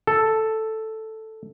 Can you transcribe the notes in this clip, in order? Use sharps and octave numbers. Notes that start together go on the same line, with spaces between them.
A4